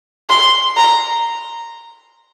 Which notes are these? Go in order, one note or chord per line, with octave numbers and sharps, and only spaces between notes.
C6
A#5